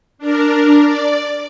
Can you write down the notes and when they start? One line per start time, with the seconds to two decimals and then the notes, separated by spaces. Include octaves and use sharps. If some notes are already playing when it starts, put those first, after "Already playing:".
0.18 D4 A#4
0.80 D5